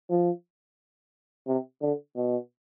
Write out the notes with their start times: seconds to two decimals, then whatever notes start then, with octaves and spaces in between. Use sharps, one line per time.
0.10 F3
1.47 C3
1.81 D3
2.16 B2